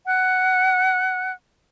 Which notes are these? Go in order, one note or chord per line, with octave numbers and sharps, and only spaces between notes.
F#5 F#6